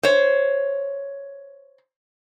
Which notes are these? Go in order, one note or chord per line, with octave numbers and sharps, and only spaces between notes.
C5 C#5